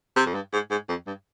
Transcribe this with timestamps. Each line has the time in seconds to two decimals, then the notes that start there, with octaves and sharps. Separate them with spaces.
0.16 C3
0.26 F2
0.35 G2
0.53 G#2
0.71 G#2
0.89 F2
1.07 G2